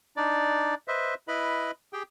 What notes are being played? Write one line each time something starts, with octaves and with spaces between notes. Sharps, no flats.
D4 D#4 D5
B4 C5 D#5 E5
E4 B4 D#5 B5
G4 G#4 G5